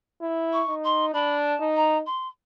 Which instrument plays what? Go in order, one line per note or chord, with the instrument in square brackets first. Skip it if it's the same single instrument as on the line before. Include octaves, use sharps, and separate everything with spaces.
[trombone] E4
[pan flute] C#6
[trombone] D#4
[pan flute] C6
[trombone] D4 [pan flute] B5
[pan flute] A5
[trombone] D#4
[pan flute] A#5
C6